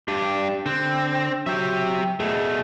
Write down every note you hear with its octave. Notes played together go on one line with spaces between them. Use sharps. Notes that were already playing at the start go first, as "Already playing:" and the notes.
G2 D4 G4
D3 C4 F#6
F#3 G4 E5
B2 A3 G#4